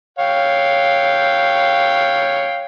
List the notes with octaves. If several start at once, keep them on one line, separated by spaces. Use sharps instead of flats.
C#5 F5 G5